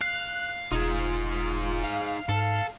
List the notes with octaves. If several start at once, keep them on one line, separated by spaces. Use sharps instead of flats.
F5 F#6
E1 D#4 F4 G#4
F5
G#2 A4